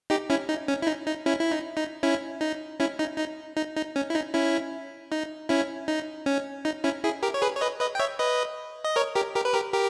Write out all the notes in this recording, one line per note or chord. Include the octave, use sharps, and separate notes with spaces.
D#4 G4
C#4 E4
D#4
C#4
E4
D#4
D#4
C#4 E4
E4
D#4
D#4
C#4 E4
D#4
C#4 E4
D#4
D#4
D#4
D#4
C#4
E4
D#4
C#4 E4
D#4
C#4 E4
D#4
C#4
D#4
C#4 E4
E4 G#4
G4 A#4
C#5
G#4 B4
C#5
B4 D#5
B4 D#5
G5
C#5 E5
B4 D#5
D#5
A#4 C#5
G4 A#4
G4 A#4
B4
G4 A#4
G4 A#4